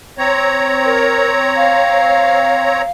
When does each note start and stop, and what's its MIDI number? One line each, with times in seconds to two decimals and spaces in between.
0.18 2.82 60
0.18 2.82 73
0.18 2.82 82
0.84 1.29 70
1.56 2.91 77